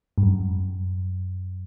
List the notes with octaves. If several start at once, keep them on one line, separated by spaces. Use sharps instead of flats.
G2
F#2